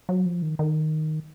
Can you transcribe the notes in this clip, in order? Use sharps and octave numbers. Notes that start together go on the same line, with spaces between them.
F#3
F3
D#3
D#3